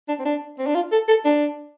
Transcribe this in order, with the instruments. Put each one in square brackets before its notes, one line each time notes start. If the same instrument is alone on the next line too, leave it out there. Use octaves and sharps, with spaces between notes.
[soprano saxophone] D4
C4
D4
C4
D4
F4
A4
A4
D4